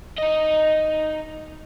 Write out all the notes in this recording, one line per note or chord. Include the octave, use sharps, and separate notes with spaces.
D#4 D#5